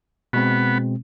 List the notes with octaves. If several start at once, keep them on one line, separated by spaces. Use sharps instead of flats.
B2 G#3 B3 C4